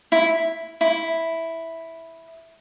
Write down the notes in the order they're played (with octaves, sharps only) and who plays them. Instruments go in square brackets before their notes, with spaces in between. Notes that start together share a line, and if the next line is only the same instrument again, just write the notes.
[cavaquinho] E4
E4